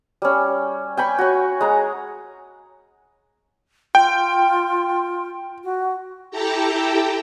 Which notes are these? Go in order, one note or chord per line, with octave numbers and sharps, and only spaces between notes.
G3 C#4
G5 G#5 B5 C#6
F#4 C#5
G#3 A#5
F4 G5
F#4
E4 G4 A4 G5 A5 A#5